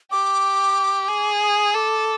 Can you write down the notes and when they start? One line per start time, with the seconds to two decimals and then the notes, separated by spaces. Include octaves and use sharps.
0.11 G4 D6
1.09 G#4
1.41 D#6
1.74 A4 D6